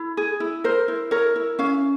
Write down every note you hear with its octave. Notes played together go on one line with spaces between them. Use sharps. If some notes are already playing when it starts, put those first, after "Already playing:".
Already playing: E4
G#4
E4
A#4 C5
E4
A#4 C#5
E4
C#4 F5